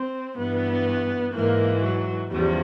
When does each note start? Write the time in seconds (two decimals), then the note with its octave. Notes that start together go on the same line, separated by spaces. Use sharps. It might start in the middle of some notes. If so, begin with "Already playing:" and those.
Already playing: C4
0.38 G2 E3 B3
1.34 G#2 E3 A#3
1.83 F#3
2.31 E2 C#3 F3 G3